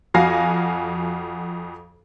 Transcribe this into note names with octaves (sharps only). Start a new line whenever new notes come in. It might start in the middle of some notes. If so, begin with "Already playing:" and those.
F2 F#4 F5 G#5 A#6 C7